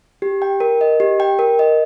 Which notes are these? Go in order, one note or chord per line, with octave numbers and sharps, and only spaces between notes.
G4
G5
A#4
D#5
G4
G5
A#4
D#5